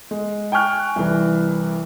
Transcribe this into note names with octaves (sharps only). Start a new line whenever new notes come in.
G#3
G5 G#5 C#6 F6 F#6
C2 E3